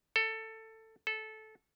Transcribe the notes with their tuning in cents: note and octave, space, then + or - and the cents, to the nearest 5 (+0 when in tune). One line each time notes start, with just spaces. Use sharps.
A4 +15
A4 -15